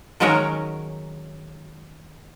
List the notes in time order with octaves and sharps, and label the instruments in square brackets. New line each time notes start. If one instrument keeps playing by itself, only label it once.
[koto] D#3 F#3 G#3 C#4 A#4 C#5